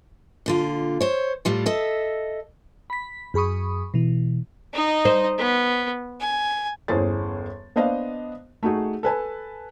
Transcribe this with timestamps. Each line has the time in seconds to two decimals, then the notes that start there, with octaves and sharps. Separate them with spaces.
0.46 A#2 D3 F4
1.01 C5 C#5
1.45 A2 G3 F4
1.66 A4 D#5 E5
2.90 B5 B6
3.34 F#2 G#4 B5 C#6 D#6
3.94 B2 E3
4.73 D#4 D#5
5.05 C5
5.38 B3
6.20 G#5
6.88 G1 E2 C#4 G#4 C5 A6
7.76 B3 D4 C5 D#5 F5
8.63 A3 D#4 F#4 G#4
9.03 A4 B4 G#5 A5